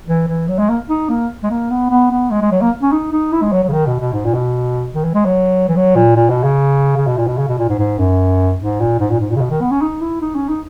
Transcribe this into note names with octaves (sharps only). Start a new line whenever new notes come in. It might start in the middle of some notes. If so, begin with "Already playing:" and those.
E3
E3
F#3
G#3
A#3
D#4
A#3
G#3
A#3
B3
B3
B3
G#3
G#3
F#3
A#3
C#4
D#4
D#4
E4
G#3
F#3
F#3
C#3
D#3
B2
B2
G#2
A#2
B2
D#3
E3
G#3
F#3
E3
F#3
A#2
A#2
B2
C#3
C#3
B2
A#2
B2
C#3
B2
A#2
G#2
G#2
F#2
G#2
A#2
G#2
A#2
G#2
A#2
C#3
B2
D#3
B3
C#4
D#4
E4
D#4
C#4
D#4